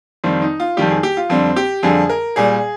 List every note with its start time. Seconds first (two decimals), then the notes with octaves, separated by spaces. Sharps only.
0.24 F2 D#3 G3 C4
0.42 D#4
0.60 F4
0.77 F2 D#3 G3 G4
0.90 G#4
1.03 G4
1.17 F4
1.30 F2 D3 G3 C4
1.56 G4
1.83 F2 D3 G3 G#4
2.10 A#4
2.36 A#2 G3 G#4